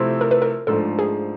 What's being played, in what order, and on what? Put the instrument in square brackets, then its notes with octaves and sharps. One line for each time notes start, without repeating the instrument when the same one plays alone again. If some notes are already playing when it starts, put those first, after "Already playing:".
Already playing: [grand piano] C3 F3 A3 C4 E4
[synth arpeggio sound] A#4
B4
A#4
[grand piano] G#2 F3 A3 D4 [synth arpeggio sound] A4
[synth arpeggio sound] G#4